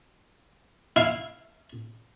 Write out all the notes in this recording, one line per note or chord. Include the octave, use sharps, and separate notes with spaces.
E4 F5